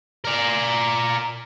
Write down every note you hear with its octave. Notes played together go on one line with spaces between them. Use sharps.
A#4 D5